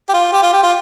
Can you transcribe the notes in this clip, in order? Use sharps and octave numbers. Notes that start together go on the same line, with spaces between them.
G4
F4
G4
F4
G4
F4